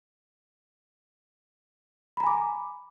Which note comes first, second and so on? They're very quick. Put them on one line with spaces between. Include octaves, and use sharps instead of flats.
B5 A#5 G#5 D6